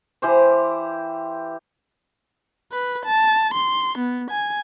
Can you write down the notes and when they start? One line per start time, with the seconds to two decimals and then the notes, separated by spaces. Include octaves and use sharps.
0.22 E3 G4 C5
2.72 B4
3.06 A5
3.55 C6
3.99 B3
4.31 G#5